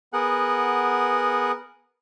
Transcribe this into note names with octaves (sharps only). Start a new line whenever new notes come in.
B3 G#4 A#4 F#5